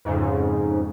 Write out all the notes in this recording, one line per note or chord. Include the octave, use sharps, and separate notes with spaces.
F2 G#2 C#3